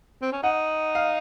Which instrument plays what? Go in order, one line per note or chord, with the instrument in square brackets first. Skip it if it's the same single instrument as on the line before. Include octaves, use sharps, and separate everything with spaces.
[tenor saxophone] C4
C#4
[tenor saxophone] D#4 [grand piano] F#5
[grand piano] F5